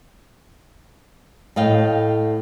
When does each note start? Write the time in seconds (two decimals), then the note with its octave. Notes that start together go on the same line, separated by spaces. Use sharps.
1.56 A2 D#5 F5 G5